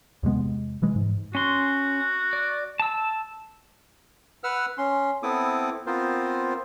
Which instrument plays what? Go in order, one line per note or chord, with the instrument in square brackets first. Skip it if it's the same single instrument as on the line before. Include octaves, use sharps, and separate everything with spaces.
[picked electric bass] E2 C3 G#3 B3
C3 E3 G#3
G#2
[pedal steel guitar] C#4 C6 [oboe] F#4
[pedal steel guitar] D5
A5 E6
[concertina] B4 F#5 E6 F6
C#4 C6
B3 C4 E4 A4 D6 D#6
B3 C4 F4 A#4 C5